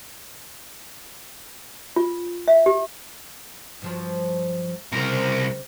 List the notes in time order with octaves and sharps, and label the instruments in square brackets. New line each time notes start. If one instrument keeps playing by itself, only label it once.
[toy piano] F4
E5
G4
[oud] G2 F3 F#3
[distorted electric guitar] C2 A#4 [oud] C#3 C4